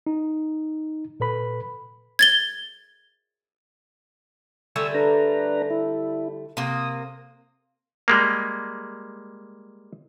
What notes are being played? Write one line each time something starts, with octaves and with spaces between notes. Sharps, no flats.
D#4
A#2 A4 B4 B5
G#6 A6 G7
D3 G3 A3 G#5 C#6 E6
D4 B4 A#5
E4
C3 A#3 D#6
G3 G#3 A#3